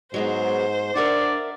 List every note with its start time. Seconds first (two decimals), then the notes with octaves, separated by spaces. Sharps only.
0.14 G#2 F#3 G#3 B3 C5
0.96 D4 A#4 D5 E5 F#5